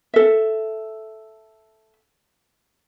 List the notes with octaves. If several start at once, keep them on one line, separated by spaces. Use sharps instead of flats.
A4 E5